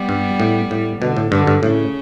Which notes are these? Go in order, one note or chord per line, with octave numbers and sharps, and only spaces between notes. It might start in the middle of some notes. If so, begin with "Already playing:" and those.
Already playing: G3 B3
G2
A2
A2
B2 D3
A2
G2 D3
G2
A2 C#3